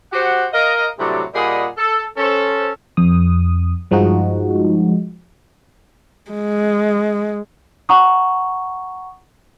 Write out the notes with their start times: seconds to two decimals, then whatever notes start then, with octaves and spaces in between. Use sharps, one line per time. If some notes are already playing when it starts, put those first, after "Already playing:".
0.13 F#4 G4 C5 F#5
0.53 A#4 D#5 F5
0.99 A2 C3 F#3 G3 D4 G4
1.35 A#2 G3 G#4 D#5 F#5 B5
1.78 A4
2.17 C#4 A4 C5
2.97 F2 D#6
3.91 G2 F3 G#3 D#4 F#4
6.31 G#3
7.89 F#5 A#5 C#6 D#6